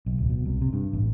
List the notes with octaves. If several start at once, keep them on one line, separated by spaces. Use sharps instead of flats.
B1
D1
B2
C2
C3
G2
A1